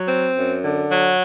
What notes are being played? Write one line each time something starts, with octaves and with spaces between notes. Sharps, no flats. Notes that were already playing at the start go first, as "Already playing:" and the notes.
Already playing: F#3
C4
F#2
D3
F#3